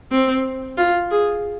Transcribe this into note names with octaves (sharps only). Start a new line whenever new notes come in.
C4
F4
G#4